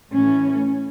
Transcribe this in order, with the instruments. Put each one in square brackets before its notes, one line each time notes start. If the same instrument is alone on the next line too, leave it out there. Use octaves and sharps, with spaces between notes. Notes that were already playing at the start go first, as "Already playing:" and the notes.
[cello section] A2 E3 A3 C#4